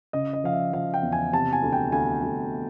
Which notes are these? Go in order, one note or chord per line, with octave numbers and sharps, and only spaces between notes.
C#3 D#5
D#5
F3 F5
E5
F3 F5
G5
E2
G#5
C3 A5
G#5
D2
G5
D2 G#5
D2